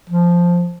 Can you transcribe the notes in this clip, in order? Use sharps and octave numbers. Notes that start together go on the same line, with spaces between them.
F3